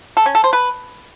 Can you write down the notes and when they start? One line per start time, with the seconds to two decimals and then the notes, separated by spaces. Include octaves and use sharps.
0.17 A4
0.26 C#4
0.35 A4
0.44 C5
0.53 B4